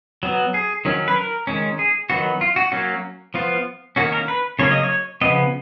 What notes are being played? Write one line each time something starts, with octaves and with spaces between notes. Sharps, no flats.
F#3 B3
G#4
D#3 F#3 C#4
B4
A#4
D#3 G#3 C#4
G#4
D#3 F#3 B3 F#4
F4
F#4
F#3 A#3 C#4 F#4
F3 B3 F4
D#3 A#3 C#4 F#4
A#4
B4
C#3 F#3 A#3 C#4 C#5
D#5
C#5
C#3 F3 B3 D#5